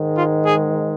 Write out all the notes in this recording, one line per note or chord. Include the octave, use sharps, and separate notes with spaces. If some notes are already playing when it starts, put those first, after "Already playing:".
Already playing: G#2 D#3 G#3
F4
G#4